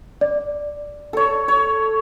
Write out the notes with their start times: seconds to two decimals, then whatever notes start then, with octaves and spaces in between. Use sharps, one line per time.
0.21 D5
1.13 A4 C#5
1.48 C#5